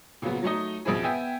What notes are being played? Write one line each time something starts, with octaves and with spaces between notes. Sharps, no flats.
A#2 C#3 F3 F#3 B3
F#3 A3 D#4 D#5
A1 F2 B2 C4 E4 G#4
B3 E5 G5 G#5